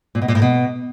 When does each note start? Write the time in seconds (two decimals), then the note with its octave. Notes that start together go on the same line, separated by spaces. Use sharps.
0.15 A#2
0.22 B2
0.28 A#2
0.35 A2
0.42 B2